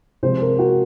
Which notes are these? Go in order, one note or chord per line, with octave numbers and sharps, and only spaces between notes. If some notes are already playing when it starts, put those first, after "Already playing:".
C3 F3 G#3 C5
A#4
F#4